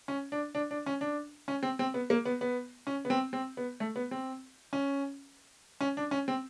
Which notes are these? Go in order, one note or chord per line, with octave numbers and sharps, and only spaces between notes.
C#4
D4
D4
D4
C#4
D4
C#4
C4
C4
B3
A#3
B3
B3
C#4
B3
C4
C4
B3
A3
B3
C4
C#4
C#4
D4
C#4
C4